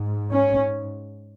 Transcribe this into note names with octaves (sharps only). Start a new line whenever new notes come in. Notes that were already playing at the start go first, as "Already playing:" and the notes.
Already playing: G#2
C#4